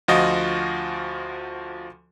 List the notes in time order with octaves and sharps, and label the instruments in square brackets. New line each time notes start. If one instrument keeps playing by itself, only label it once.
[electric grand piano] D2 F3 F4 F#4 D#5